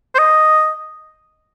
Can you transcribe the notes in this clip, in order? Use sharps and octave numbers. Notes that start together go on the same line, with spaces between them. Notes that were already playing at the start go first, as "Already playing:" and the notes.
C5
D#5